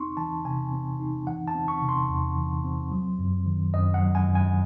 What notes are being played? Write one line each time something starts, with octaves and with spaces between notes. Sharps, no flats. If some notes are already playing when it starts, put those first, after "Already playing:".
Already playing: C4 D#4 C6 C#6
E3 A5
C3 G#5
C4
D#4
E3 F#5
A5
C4
C#6
C3
C6
E2
E3
C4
F#3
F#2
D#3
F#2 D#5
F#5
F#3
G#5
F#2
G#5